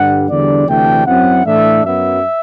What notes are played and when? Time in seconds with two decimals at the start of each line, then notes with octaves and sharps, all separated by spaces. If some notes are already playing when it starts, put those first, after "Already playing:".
Already playing: G2 D3 G3 F#5
0.29 E2 D3 G3 D4 D5
0.67 D2 C3 E3 A3 D4 G5
1.05 F#2 F#3 C4 E4 F#5
1.44 A2 E3 A3 D4 E5
1.82 F#2 F#3 B3 E5